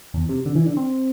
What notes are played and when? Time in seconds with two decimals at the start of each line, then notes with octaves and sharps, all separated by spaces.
0.14 E2
0.29 C3
0.46 D3
0.55 E3
0.66 D3
0.77 C4